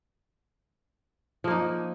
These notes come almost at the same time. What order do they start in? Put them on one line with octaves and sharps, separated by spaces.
F3 A#3 D#4